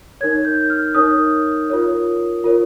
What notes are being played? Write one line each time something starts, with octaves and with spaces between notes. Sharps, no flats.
D#4 A#4 C#5 G#6
G6
F6
D#4 A#4 C#5 D#6
F4 A#4 C#5
F4 A#4 C#5